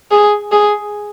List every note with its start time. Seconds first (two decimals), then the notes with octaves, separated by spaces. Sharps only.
0.11 G#4
0.52 G#4